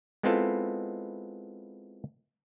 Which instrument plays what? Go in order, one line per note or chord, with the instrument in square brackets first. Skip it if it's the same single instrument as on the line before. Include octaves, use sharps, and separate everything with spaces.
[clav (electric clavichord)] G#3 B3 C4 E4 F4 A4